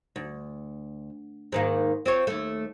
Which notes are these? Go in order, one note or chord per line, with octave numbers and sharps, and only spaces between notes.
D2
G#2 D#3 A#3
C4 F4 C#5
D#2 A3